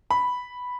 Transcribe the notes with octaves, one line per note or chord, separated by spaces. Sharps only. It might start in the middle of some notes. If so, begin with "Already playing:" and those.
B5